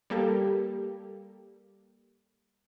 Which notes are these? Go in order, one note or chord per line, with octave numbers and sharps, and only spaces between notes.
G3 A#3 G4 A4